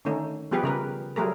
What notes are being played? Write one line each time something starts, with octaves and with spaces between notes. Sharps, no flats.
D3 D#3 A3 C#4 D#4
F3 G3 B3 G4 G#4 B4
C#3 A#4 B4
F#3 G3 A3 G#4 A#4